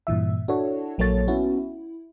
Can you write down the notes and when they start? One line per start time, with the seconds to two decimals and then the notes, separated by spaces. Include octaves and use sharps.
0.07 G2 A#2 E3 E5
0.48 D4 E4 F#4 A4 C#5
0.98 A#1 F#3 A#3 A4 C#5 A6
1.28 B3 C#4 E4 F#4
1.58 E4